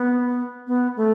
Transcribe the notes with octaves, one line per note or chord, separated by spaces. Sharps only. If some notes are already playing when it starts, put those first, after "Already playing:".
Already playing: B3
B3
A3